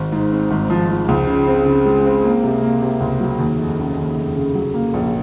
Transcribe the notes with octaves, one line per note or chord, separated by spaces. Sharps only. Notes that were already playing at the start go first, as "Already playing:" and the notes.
Already playing: G#1
G#2
C4
G#1
F3
F3
C#2
C#3
C4
C#3
G#3
C4
A#3
C3
A#3
C3
C#2
F#3
D#2
F1
C#3
D#2
F1
C#3
F#3
A#3
A#1